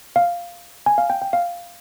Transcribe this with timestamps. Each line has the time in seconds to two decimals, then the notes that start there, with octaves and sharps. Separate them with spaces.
0.16 F5
0.86 G#5
0.98 F5
1.10 G5
1.22 G5
1.33 F5